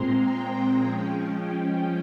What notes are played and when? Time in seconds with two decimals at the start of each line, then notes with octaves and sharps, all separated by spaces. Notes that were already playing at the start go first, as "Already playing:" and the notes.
Already playing: A#2 G#3 C4 A#5 C6
0.20 G5
0.76 F3 G#3 C#4